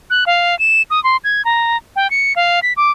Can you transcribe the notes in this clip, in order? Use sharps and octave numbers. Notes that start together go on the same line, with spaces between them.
F#6
F5
E7
D#6
C6
G#6
A#5
G5
C#7
F5
B6
D6